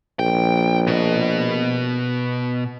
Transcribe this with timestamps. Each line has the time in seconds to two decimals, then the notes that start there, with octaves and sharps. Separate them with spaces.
0.19 A#1 G5
0.87 B2 D#5